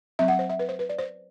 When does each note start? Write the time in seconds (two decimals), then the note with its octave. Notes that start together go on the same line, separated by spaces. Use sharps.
0.19 F#3 C4 E5
0.28 F#5
0.39 C5
0.49 E5
0.59 B4
0.69 C5
0.79 B4
0.89 D5
0.99 C5